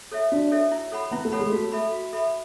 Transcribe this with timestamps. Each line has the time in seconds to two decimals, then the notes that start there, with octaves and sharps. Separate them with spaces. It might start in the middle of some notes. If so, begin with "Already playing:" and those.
0.12 A4 C#5 E5
0.32 D4 F#4
0.51 A4 C#5 E5
0.72 E4
0.92 A4 C#5 F#5 B5
1.11 B3 E4
1.25 A3
1.32 A4 C#5 F#5 B5
1.39 G#3
1.52 A3 F#4
1.72 A4 E5 B5
1.92 F#4
2.13 A4 E5 B5